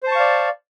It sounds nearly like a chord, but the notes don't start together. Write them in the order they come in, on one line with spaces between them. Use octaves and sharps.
C5 A5 C#6 F5 D5